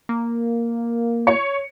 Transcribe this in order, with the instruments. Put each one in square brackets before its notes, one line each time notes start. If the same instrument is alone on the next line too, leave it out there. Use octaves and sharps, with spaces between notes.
[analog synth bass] A#3
[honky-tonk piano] C#5 C#7